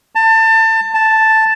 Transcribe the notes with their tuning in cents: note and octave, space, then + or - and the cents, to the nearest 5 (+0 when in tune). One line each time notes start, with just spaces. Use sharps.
A5 +25
A5 +0